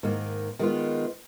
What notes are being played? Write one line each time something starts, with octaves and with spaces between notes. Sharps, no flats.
G#2 D#3 A#3
D#3 G#3 B3 F4